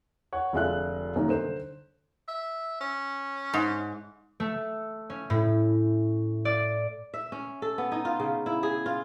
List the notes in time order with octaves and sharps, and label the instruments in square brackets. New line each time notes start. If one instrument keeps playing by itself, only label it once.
[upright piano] C#5 F#5
F1 D3 G#3 F4 E5 F#6
F#2 C3 D#3 G3 A#3 D#4
D3 C5 E7
[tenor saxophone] E5
C#4
[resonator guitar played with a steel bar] G#2
[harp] A3
C#4
A2
D5
[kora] E5
C#4
A4
B3
D#4
F4
C#3
E4
G#4
F4